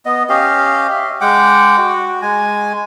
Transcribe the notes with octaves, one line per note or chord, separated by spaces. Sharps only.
B3 D#5
C#4 G4 D#5 F5
E5
G#3 F#5 G5 D6
F#4
G#3 G#5